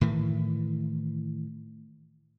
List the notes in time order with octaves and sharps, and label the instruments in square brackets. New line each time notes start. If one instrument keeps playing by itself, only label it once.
[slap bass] A2 D#3 E3